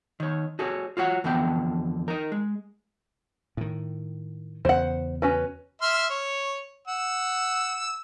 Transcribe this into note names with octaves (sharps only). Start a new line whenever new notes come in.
D#3 C#5
F#4 G#4 A4 C#5
F4 F#4 C#5 F#5
F2 D3 E3 B3 G5
D#4 A#4
G#3
A2 D#3
E2 C#3 C5 F#5
C#4 F#4 B4
E5 C6 F6
C#5
F#5 E6